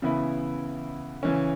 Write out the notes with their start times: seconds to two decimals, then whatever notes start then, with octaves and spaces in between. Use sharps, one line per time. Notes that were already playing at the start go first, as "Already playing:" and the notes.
0.02 C#3 E3 B3 E4
1.23 C#3 E3 C#4